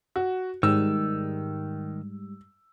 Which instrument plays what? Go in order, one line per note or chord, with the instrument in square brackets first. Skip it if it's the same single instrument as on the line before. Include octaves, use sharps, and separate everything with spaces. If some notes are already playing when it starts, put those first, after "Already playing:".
[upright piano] F#4
[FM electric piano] G#2 G3 [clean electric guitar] D#3 [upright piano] E6